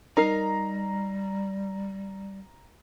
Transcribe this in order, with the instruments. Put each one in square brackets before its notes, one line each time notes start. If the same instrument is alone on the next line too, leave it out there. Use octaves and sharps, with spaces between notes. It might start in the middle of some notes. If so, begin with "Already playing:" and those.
[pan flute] G3 [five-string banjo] D#4 A#4 [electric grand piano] A#5 C7